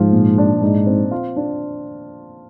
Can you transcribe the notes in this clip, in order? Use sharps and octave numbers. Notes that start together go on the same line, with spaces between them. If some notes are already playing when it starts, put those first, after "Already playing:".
Already playing: G#2 F3 F4
A#2
D4
G#2 D#4
C4
F4
D4